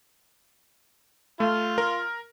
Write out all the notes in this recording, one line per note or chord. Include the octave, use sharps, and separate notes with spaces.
A3 F4
A#4